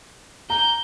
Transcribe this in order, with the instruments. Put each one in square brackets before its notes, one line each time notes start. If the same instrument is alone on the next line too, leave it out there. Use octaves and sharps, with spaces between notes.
[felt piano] A#5 [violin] G6